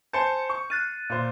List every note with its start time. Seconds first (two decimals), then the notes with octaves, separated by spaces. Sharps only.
0.13 C5 G#5 A5 G6 C#7
0.50 C#6
0.70 F6 F#6 A6 D#7
1.10 A#2 C5